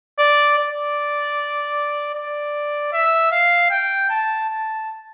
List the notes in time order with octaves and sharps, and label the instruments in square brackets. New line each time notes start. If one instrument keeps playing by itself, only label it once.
[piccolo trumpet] D5
D5
D5
E5
F5
G5
A5
A5